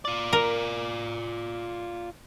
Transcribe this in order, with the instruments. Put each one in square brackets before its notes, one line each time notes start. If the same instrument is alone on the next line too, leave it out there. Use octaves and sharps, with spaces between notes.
[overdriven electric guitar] F4 D5
[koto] A#4